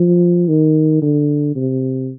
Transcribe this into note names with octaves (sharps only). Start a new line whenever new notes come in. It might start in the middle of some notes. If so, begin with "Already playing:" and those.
Already playing: F3
D#3
D3
C3